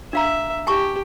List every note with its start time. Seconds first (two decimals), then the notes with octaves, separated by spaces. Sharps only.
0.13 D4 E5 F5 A#5
0.67 G4 G#5 A5 C#6